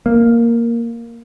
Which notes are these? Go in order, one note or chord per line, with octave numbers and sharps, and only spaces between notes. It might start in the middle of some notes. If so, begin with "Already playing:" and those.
A#3